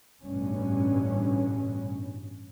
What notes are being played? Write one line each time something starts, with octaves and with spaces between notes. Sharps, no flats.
A1 G2 B2 C#4